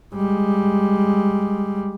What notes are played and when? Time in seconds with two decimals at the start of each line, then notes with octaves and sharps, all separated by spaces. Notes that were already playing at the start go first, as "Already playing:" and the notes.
0.15 G3 G#3